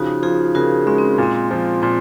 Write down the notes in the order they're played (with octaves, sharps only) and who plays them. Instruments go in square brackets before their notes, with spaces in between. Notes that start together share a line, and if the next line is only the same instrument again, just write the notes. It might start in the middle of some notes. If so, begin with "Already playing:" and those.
Already playing: [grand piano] C#3 F3 [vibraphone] D#4 F#4
[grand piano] F3 [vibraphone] F4 G#4
[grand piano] C#3 [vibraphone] F#4 A#4
[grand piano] G#3 [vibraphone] C#4
[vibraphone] C4
[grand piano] A#2 [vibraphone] C4
[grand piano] F3
[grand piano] A#2 [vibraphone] C4